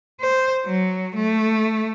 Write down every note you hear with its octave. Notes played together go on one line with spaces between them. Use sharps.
C5
F#3
A3